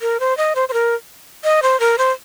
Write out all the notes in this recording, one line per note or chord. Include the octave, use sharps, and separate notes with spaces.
A#4
C5
D#5
C5
C5
A#4
D#5
C5
A#4
C5